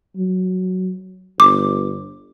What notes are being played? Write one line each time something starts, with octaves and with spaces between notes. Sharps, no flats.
F#3
G1 D6